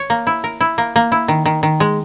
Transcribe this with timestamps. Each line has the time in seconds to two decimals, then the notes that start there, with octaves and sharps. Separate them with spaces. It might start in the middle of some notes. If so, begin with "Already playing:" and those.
Already playing: C#5
0.10 A#3
0.27 E4
0.44 A#4
0.61 E4
0.78 A#3
0.96 A#3
1.12 E4
1.28 D#3
1.46 D#3
1.63 D#3
1.80 G#3